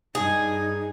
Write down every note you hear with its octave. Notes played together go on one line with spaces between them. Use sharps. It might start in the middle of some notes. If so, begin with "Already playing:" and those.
G2 D#4 G#4